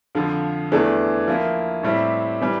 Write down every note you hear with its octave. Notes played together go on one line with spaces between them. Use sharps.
F2 D3 F3
E2 E3 A3 D4
F3 A#3 E4
A2 G3 C4 E4 G4
E3 G3